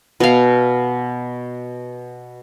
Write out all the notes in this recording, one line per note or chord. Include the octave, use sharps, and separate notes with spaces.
B2 F5